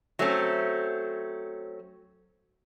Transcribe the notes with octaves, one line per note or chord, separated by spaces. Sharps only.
F#3 A3 C4 C#4